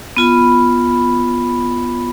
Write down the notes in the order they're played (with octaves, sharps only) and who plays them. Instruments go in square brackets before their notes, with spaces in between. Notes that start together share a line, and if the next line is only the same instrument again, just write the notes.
[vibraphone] B3 F4 B5